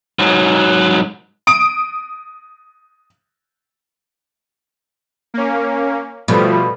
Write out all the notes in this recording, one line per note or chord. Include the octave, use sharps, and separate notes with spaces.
G#2 F#3
D#6 D7
A#3 C#4
B2 F3 G3 A3